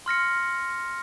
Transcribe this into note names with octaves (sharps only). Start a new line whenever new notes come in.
C6 F6 A#6 C#7